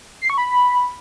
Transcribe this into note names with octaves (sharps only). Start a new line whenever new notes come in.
C7
C#6
B5